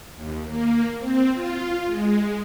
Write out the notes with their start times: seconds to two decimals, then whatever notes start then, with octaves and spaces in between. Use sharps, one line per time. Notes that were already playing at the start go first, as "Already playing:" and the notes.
0.16 D#2
0.49 A#3
0.99 C4
1.33 F4
1.87 G#3